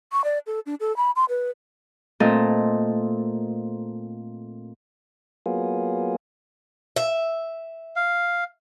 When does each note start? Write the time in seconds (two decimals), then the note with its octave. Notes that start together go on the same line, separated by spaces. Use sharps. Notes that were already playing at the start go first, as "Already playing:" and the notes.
0.12 C#6
0.24 D5
0.47 A4
0.66 D4
0.80 A4
0.97 B5
1.16 C6
1.29 B4
2.20 A#2 A3 C4 A4 A#4 D#5
5.46 F#3 A#3 B3 F4 G#4
6.96 E5
7.96 F5